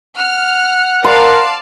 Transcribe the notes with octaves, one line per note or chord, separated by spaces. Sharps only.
F#5 F6
A#4 D5 F5 A5 C6